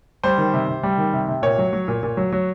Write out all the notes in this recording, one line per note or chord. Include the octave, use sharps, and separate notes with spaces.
G3 C5
D#3
C3
C3
G3
D#3
C3
C3
A#2 C#5
F#3
F#3
A#2
A#2
F#3
F#3